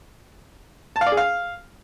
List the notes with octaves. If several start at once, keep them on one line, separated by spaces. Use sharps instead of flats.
A5
F5
D5
G#4
F5